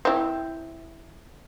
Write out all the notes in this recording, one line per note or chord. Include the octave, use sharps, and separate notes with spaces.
C4 E4